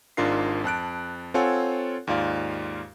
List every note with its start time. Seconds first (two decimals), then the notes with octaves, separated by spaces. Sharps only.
0.17 G#1 G#2 D4 F4 A#4 C7
0.64 F2 A5 F#6 D7
1.34 C4 F4 A4 C#5 F#5 G#5
2.07 D#2 G#2 F4 D5 F5